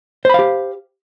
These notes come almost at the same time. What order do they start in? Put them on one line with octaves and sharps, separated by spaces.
C5 B5 F5 G4